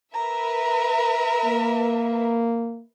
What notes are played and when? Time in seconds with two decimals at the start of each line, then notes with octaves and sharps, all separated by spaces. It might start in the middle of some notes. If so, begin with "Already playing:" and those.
0.14 A#4 B4 E5 A#5
1.45 A#3